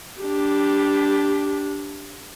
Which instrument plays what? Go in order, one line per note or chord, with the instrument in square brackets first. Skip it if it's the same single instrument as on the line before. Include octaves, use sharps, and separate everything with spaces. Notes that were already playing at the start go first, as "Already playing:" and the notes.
[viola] D4 G4